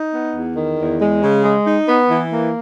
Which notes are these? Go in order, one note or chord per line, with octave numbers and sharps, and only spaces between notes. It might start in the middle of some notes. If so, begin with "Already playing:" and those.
Already playing: D#4
B3
E2
D#3
E2
G#3
C#3
G#3
D#4
B3
E3
A#3